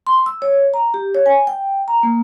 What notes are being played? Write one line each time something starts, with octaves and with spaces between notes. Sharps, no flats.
C6
E6
C#5
A#5
G4
C#5
G#5
G5
A#5
A#3